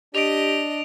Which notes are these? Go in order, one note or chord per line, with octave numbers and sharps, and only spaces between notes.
D4 G4 D5 D#5 D7 F7